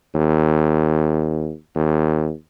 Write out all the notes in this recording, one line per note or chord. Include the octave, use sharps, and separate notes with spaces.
D#2
D#2